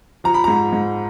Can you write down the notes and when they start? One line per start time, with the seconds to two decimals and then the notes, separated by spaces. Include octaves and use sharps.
0.24 F3 A#5
0.34 B5
0.44 G#2 A#5
0.73 G#2